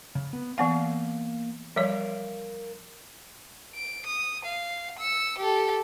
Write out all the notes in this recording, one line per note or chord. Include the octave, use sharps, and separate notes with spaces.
C#3
B3
E3 A#3 B3 F5 F#5
F3 G3 A#4 C#5 F5
D7
D#6
F5
E6 C#7
G4 A4